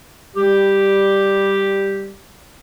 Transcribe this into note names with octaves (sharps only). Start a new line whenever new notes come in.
G3 G4